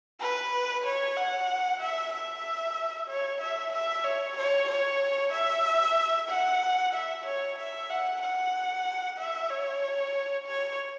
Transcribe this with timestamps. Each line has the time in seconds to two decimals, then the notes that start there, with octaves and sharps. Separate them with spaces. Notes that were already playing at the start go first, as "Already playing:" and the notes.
0.20 B4
0.84 C#5
1.16 F#5
1.80 E5
2.13 E5
3.08 C#5
3.41 E5
3.73 E5
4.04 C#5
4.37 C#5
4.69 C#5
5.33 E5
6.29 F#5
6.94 E5
7.26 C#5
7.58 E5
7.90 F#5
8.22 F#5
9.18 E5
9.50 C#5
10.46 C#5